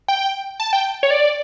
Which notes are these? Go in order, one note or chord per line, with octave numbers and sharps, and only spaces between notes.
G5
A5
G5
C#5
D5